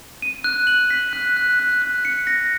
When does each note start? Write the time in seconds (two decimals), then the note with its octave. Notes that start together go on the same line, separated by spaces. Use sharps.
0.22 D#7
0.44 F#6
0.67 F#7
0.90 B6
1.13 F#6
1.37 F#6
1.59 F#6
1.82 F#6
2.05 C#7
2.27 A#6